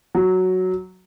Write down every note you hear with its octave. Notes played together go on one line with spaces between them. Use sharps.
F#3